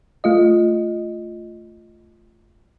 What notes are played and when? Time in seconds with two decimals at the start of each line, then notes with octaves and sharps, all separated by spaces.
0.24 A3 F4 D#5